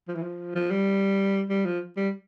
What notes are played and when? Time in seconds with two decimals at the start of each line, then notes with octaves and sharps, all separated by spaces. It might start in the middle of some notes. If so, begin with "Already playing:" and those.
0.08 F3
0.15 E3
0.23 F3
0.56 F3
0.71 G3
1.50 G3
1.65 F3
1.97 G3